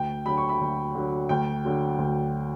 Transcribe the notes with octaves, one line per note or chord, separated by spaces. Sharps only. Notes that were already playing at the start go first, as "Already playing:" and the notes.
Already playing: D2 G5
D3 F#3 B5
C#6
B5
D2
D3 F#3
D2 G5
D3 F#3
D2